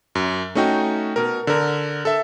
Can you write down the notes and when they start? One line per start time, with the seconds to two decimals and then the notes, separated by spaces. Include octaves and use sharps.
0.15 F#2
0.55 A3 C#4 D#4 F#4 G5
1.16 B2 A#4
1.47 D3 A#4
2.05 A4 E5